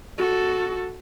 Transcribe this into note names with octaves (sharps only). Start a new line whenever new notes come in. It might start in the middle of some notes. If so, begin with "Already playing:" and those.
F#4 A4